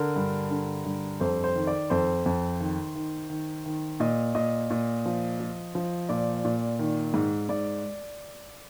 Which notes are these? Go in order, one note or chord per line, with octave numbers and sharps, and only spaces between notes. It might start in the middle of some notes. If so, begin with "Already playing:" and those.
Already playing: D3 A#4
G2
D3
G2
F2 C5
C5
D#3
D5
F2 C5
F2
D#3
D#3
D#3
D#3
A#2 D#5
A#2 D#5
A#2
F3
F3
F3
A#2 D5
A#2
D#3
G#2
G#2 D5